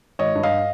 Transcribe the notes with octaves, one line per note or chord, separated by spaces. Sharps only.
G#1 C#5 D#5
G2
D#5 F5